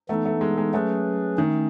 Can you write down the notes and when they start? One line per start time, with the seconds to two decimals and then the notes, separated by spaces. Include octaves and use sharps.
0.09 E3 A3 B3 D#4 A4
0.25 A3
0.41 G#3
0.58 G#3
0.74 F#3 A3 C#4 G#4 B4
1.37 D#3 A3 C#4